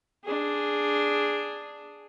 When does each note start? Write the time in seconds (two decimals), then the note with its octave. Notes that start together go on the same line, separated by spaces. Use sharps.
0.24 D4 G#4